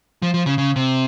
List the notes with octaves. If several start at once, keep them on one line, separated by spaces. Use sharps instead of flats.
F3
F3
C#3
C#3
C3